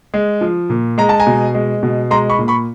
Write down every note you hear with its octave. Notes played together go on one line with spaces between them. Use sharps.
G#3
F3
A#2
G#3 A#5
A5
G#5 A#5
B2
G#3
B2
G#3 A#5 C6
B5 C#6
A#2
B5 C#6